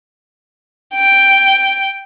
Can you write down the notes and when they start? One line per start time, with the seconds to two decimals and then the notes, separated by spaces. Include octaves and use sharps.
0.94 G5